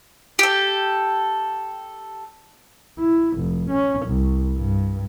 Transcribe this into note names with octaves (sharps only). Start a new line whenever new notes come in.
G4 A4
E4
F1
C#4
C2
G2